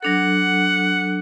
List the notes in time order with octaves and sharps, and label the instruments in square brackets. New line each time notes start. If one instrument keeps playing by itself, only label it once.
[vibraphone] F#3 D4 A4 [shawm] F#5